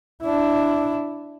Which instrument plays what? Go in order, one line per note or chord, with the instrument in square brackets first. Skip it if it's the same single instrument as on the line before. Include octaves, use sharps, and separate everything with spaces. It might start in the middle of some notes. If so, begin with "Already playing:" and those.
[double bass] D4 E4